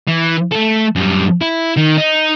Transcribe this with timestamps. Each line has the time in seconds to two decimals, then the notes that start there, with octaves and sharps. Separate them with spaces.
0.07 E3
0.52 A3 A4
0.96 F#2 G3
1.41 E4
1.77 D#3
1.97 D#4